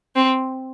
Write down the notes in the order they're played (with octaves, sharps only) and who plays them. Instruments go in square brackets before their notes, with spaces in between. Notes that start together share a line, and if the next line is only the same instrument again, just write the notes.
[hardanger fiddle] C4